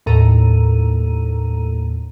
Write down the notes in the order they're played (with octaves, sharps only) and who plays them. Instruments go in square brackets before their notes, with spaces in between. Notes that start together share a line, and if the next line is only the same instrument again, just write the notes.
[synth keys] D#2 A2 A4 A#5 D#7